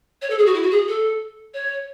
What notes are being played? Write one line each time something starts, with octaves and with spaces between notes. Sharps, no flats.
C#5
A4
G#4
F#4
E4
F#4
G#4
A4
C#5